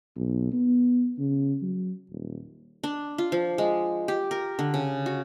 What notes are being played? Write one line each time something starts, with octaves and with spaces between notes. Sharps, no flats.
B1
B3
C#3
F#3
D#1
D4
F4
F3
G#3
G4
A#4
D3
C#3
F#4